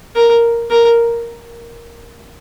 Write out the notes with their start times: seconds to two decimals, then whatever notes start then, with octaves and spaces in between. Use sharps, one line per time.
0.16 A#4
0.71 A#4